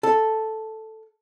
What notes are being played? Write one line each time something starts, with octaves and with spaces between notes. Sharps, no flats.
A4